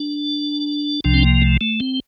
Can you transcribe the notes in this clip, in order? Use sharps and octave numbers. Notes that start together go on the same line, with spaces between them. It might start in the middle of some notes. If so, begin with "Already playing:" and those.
Already playing: D4
C2 C3 F3 D4
C4
A#3
A3
A3
C4